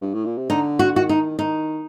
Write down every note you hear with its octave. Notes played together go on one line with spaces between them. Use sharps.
G2
A2
A#2
C3
D3 D#4
F#4
D#3 F#4
D#4
D#3 D#4